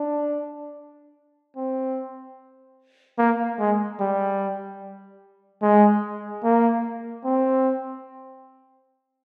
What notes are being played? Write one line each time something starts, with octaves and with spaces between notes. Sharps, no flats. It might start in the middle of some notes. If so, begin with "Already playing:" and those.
Already playing: D4
C4
A#3
G#3
G3
G#3
A#3
C4